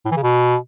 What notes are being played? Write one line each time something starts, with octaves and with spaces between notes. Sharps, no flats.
A2
E3
C#3
B2